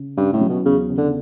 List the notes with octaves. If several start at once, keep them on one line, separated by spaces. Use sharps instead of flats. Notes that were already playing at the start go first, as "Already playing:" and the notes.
Already playing: C#3
G2 C#4
A2
F#3
B2
E2 C#3
C#3
D3